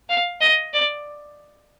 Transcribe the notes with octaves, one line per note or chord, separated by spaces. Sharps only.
F5
D#5
D5